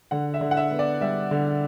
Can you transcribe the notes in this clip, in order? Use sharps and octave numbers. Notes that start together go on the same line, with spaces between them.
D3 F#5
E5
D3
F#5
E5
B3
D5
G3 E5
D3